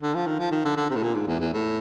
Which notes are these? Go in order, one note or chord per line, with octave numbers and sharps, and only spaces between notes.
D3
F3
D#3
F3
D#3
D3
D3
C3
A2
A#2
G#2
E2
E2
A2